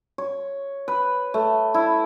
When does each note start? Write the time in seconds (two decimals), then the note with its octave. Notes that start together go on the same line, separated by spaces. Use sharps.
0.18 C#5
0.88 B4
1.34 A3
1.74 E4